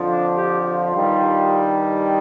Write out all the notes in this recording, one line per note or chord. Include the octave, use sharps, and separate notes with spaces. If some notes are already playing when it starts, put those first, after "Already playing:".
Already playing: F2 D3 F3
D4
G4
F4
G2 D#3 G3